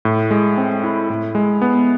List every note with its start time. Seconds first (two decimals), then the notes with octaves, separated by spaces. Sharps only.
0.05 A2
0.31 G#3
0.58 C4
0.84 E4
1.10 A2
1.35 G#3
1.62 B3